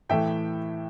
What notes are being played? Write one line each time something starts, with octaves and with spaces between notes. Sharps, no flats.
A2 E3 A3 E5 G5